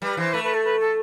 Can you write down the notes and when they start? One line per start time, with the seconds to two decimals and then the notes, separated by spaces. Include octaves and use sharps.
0.02 G3 B4
0.17 E3 C5
0.33 A3 B4
0.44 B4
0.54 A4
0.64 B4
0.80 A4